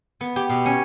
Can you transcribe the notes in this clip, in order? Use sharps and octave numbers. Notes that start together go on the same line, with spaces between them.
B3
G4
B2
C#4